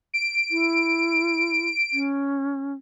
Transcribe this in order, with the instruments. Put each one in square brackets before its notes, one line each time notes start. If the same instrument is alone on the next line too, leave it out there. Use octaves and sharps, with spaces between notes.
[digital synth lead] D7
[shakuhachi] E4
C#4